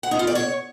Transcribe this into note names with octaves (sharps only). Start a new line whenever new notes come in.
F#5
D#4
F4
D5
C#5